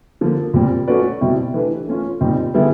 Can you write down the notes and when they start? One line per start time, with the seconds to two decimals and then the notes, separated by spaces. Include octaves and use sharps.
0.21 D3 F3 A#3
0.54 A#2 G3 C4
0.87 A3 C#4 F#4 B4 D5
1.21 B2 G3 C4 E4
1.54 E3 A3 D4 G4 B4
1.87 A3 C#4 F4
2.21 A#2 G3 C4 D#4
2.54 D3 G3 B3 E4 G#4